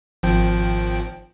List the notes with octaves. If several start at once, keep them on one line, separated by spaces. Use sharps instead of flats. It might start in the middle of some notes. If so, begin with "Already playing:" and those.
G#1 F3 G5